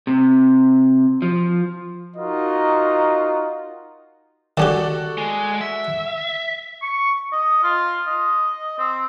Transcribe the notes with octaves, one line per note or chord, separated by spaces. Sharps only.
C3
F3
D#4 F4 F#4 A#4 D#5
D#3 C#4 F#4 G4 A4 D5
G#3
E5
C#6
D#5
F4
D#5
C4